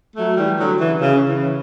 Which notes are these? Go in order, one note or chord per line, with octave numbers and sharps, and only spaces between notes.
F#3 A3
E3 G3
D3 F#3
C#3 E3
C#3
C#3 E3